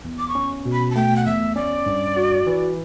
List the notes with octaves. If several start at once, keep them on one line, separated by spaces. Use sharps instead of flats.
E2
D6
C#6
C#4
B2
B5
A5
A3 G5
F#5
E2 E5
C#4 D5
G2
F#4
E3